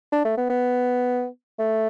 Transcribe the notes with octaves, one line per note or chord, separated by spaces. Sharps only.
D4
A3
B3
B3
A3